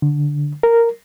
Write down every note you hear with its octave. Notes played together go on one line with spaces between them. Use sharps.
D3
A#4